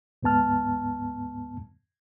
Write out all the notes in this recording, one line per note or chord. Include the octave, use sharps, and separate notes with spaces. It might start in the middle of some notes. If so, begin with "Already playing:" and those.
D2 G#2 B3 A5 F6